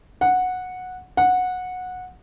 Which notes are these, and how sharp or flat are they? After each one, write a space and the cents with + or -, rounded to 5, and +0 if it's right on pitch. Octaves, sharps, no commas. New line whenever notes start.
F#5 -10
F#5 -15